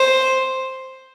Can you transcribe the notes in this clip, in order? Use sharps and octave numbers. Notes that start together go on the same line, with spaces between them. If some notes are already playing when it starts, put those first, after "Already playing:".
Already playing: C5